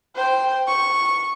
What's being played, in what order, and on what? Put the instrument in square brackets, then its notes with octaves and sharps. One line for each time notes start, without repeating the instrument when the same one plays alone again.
[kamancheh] C5 G5
C#6